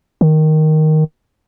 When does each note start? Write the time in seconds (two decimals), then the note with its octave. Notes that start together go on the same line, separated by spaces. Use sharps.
0.21 D#3